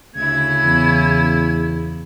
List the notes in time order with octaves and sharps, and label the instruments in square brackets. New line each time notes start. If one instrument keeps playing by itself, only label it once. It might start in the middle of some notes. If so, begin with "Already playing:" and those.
[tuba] D2 [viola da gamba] C#3 E4 [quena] G#6
[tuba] E2